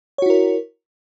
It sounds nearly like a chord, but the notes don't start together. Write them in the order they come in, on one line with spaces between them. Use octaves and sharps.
C#5 F#4 E4 A#4